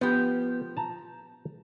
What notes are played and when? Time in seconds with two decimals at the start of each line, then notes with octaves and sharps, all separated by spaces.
0.01 F3 B3 G4
0.77 A5 A#5